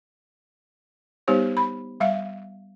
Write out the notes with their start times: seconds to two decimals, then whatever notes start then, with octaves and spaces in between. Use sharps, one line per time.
1.28 G3 B3 D#4 G4 C5 C#5
1.57 B5
2.00 G3 E5 F5